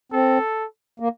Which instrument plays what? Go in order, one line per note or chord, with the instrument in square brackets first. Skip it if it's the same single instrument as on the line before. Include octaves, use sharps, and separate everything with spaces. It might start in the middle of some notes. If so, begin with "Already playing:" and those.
[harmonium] C4 [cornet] A4
[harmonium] A#3